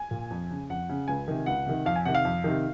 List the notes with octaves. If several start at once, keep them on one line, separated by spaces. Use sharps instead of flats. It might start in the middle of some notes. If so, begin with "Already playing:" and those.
Already playing: G#5
A#2
F2
C#3
F2 F#5
C#3
C#2 G#5
C3 D#3
C#2 F#5
C3 D#3
F2 F5
G#5
C3 D#3 F#5
F5
F2
C3 D#3